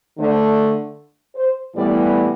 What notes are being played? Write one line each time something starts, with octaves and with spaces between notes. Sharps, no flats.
D3 A3 C5
C5
A2 E3 G3 B3 D5